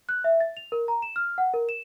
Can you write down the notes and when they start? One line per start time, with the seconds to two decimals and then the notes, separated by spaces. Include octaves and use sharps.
0.09 F#6
0.24 E5
0.40 A6
0.57 F7
0.72 A#4
0.88 A#5
1.02 E7
1.16 F6
1.38 F#5
1.54 A#4
1.69 E7